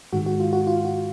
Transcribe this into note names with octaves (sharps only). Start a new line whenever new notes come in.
G#2 D#3 G#3 F#4
F#4
F4
F#4
F4
F#4